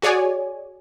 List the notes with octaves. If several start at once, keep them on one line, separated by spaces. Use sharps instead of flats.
F#4 G#4 C#5 D5 G#5